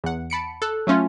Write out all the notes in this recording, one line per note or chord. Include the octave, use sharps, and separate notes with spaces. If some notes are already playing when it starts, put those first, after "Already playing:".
E2 F#5
A5 B5 C#7 D7
A4 F#6
F#3 A3 C#4 F4